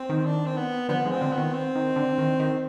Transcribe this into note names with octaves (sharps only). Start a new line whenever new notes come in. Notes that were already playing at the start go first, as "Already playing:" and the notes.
Already playing: C4
D#3
D4
C4
B3
D3 F3 B3
F3 G#3
C4
D3 F3
B3
D#3
C4
D#3
D3
D#3
D#3